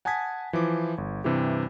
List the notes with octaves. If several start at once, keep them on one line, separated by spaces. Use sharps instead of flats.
F#5 G#5 A5 D#6 G#6 B6
E3 F3 D6
G1
G2 C3 E3 G4